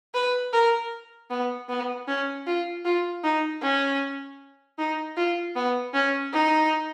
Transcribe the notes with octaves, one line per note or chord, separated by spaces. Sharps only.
B4
A#4
B3
B3
C#4
F4
F4
D#4
C#4
D#4
F4
B3
C#4
D#4